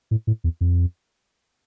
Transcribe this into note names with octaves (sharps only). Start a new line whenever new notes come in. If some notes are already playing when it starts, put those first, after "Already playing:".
A2
A2
E2
F2